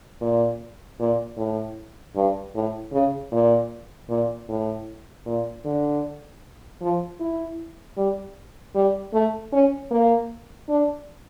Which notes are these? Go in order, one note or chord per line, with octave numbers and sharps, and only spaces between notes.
A#2
A#2
A2
G2
A2
C#3
A#2
A#2
A2
A#2
D3
F3
E4
G3
G3
A3
C#4
A#3
D4